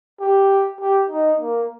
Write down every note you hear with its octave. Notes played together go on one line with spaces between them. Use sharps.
G4
G4
D#4
A#3